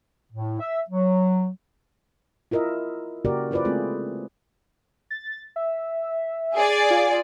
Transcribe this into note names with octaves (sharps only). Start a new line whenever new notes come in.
A2
E5
F#3
E4 F4 A#4 D#5 E5
C#3 A#3 F#4 G4 A#4 D5
E4 F4 B4 C5 D5
G#3 A3 C4 F4 G#4
A6
E5
G#4 D5
F4